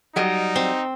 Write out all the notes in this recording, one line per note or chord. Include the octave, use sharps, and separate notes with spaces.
F#3 G3 D#4 D#5
C4